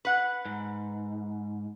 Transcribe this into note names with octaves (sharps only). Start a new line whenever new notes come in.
B4 F#5
G#2